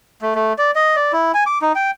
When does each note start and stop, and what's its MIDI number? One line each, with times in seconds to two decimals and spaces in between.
0.22 0.35 57
0.35 0.53 57
0.58 0.71 74
0.75 0.96 75
0.96 1.12 74
1.13 1.32 64
1.34 1.44 80
1.46 1.59 86
1.62 1.72 63
1.75 1.91 79